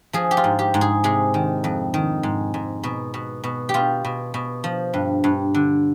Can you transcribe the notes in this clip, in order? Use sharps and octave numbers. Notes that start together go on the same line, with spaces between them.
F3 G#4
G4
F4
G#2
G4
G#2
G#4
C3 G#4
D#3
F2
D#3
G#2
G#2
B2
B2
B2
G4
B2 F4
B2
B2
F3
G2
G2
D3